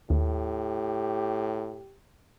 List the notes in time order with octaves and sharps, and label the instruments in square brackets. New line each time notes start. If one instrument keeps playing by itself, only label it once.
[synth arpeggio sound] D#2 [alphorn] A2 [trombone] G4